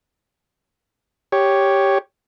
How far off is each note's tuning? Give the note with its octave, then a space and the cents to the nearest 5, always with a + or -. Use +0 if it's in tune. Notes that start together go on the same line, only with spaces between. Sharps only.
G4 +0 C#5 +0